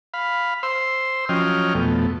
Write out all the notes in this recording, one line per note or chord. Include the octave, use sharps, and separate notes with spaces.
F5 B5
C5 C6 E6
F3 F#3 C#4 D#5 G5 F6
F2 B2 A3